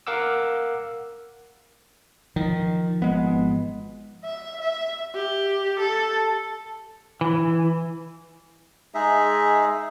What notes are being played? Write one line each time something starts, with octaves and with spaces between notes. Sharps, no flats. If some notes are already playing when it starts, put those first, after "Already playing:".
A#4 F5 F#5 D6 E6
D#3 F3
G#1 G#3 B3
E5
E5
G4
A4
E3
G#3 D#4 G#4 E5